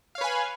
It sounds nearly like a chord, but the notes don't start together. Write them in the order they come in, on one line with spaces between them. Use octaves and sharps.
F5 C#5 B4 G#5